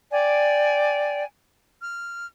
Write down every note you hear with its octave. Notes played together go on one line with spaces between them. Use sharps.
D5 G5 G#5
F6